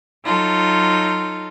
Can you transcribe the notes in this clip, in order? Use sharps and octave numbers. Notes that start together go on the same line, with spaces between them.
F#3 D#4 F4 A4